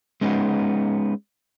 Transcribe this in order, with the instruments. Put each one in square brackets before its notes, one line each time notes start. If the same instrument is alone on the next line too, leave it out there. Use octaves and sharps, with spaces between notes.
[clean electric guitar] G#3 B3 C#4 D#4